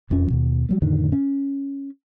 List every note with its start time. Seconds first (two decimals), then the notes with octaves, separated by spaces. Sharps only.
0.10 E1 F2 F3 C#4
0.30 D#2 B2
0.69 F#3 G3 A3
0.82 F2 A2 D3 D#3
1.12 C#4